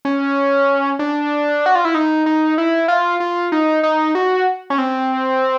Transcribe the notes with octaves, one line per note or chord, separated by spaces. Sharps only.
C#4
D4
F#4
F4
E4
D#4
D#4
E4
F4
F4
D#4
D#4
F#4
C#4
C4